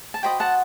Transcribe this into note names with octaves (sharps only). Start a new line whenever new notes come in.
A5
F#4 C5 D#5 G5 B5
F#5 A5